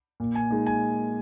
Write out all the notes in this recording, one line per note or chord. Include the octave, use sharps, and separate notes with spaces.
A#2
G#5
G#3 D#4
G#5